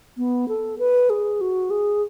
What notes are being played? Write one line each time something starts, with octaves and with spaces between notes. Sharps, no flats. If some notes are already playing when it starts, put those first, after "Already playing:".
B3
A4
B4
G#4
F#4
G#4